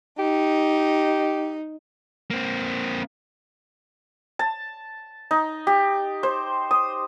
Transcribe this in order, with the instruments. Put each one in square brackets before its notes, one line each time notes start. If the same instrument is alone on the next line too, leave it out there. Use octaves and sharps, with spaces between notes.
[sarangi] D#4 [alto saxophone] G4
[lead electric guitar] A#3 C4
[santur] A5
D#4
G4
C5
D#6